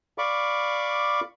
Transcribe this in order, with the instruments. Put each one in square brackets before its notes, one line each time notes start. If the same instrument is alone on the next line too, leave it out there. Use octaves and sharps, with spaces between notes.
[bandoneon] D5 F5 B5 C#6 D6